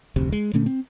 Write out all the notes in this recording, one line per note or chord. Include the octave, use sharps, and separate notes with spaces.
F1 D2 C3
G#3
A#2 D3 A3 C#4
C4